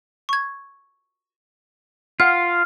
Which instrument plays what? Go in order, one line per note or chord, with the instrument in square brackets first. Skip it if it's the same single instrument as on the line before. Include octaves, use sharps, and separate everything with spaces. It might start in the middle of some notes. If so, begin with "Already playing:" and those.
[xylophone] C#6 G#6
[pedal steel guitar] F4 [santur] F5 [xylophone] F#5